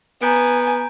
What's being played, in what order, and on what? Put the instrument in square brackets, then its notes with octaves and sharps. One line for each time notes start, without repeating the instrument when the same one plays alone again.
[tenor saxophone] B3 [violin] G#5 [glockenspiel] A#5 G6 D7